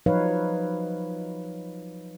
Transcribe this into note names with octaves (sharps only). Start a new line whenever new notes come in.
F3 F#3 D#4 B4 C#5 F5